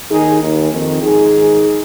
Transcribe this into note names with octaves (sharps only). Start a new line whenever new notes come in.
D#2 D#3 D#4 G#4
D#2 D#3
F2 D#3
G#2 F3 D#4 G#4
G#2 D#3